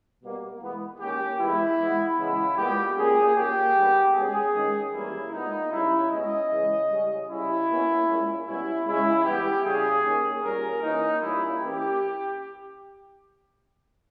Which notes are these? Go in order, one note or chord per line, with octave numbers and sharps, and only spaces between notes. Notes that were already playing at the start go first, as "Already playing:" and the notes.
B2 G3 A#3
E3 G#3 B3
D#3 A#3 C#4 G4
E3 G#3 B3 E4
E3 G#3 B3
C#3 E3 G#3 B3 E4
A#2 G#3 B3 G4
A#2 A#3 C#4 G#4
A#2 A#3 C#4 G4
D#3 G3 B3
B2 G#3 C#4 G#4
D#3 G#3 C#4
E3 G3 A#3 C#4 E4
A#2 G#3 B3 D#4
C#3 G3 C#4 E4
B2 G#3 C#4 D#5
C#3 E3 G#3 C#4
C#3 G3 C#4
C#3 G3 C#4 E4
B2 A#3 C#4
A#2 G#3 C#4
B2 G3 C#4 E4
C#3 G#3 C#4 E4
E3 G3 B3 G4
C#3 G3 C#4 G#4
D#3 A#3 C#4
A#2 G3 C#4 A#4
E3 A#3 C#4 D#4
A#2 G3 A#3 C#4 E4
E3 A#3 C#4 G4